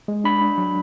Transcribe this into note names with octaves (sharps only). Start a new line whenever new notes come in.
G#3
D4 B5
D4
F#3